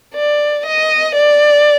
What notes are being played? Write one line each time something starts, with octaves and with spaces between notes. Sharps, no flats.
D5
D#5
D5